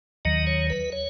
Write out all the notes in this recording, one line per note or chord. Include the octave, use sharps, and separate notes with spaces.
D#2 D#3 F#3 D#5
C#5
B4
C#5